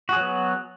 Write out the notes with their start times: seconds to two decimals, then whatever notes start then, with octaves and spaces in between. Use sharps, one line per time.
0.09 F#4
0.13 G#4
0.16 F#3
0.20 B3